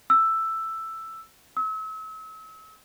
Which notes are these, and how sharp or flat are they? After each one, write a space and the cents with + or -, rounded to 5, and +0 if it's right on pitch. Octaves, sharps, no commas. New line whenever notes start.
E6 +5
E6 -35